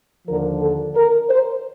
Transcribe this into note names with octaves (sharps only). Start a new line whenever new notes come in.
D#2 D3 F3 A#4
A4
A#4
C5